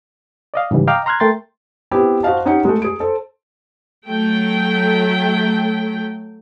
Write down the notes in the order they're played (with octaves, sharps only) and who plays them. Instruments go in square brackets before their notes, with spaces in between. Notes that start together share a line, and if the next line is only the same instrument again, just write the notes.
[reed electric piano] D5 D#5 F5
G#2 C#3 E3 G3
D#5 F5 G5 A#5 D6 F6
A#5 C6 F6 F#6 G#6
A3 A#4 G5 C6 A6
[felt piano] B3 C4 E4 G4
F#4 C5 D#5 F5 A5
C#4 D#4 G4 F#5 C#7
G#3 A3
G#4 D7
A4 C5
[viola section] F#3 A3 G5